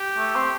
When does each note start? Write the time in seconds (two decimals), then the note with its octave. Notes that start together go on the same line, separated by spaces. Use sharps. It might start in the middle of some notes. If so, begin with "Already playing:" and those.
Already playing: G4
0.17 A3
0.35 C4